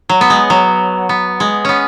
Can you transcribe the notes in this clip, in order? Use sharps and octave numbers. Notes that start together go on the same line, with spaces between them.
F#3
B3
G#3
F#3
B3
G#3
B3 C#4